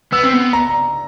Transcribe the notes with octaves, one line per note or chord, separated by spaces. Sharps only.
B3 E6
C4
B3
A#5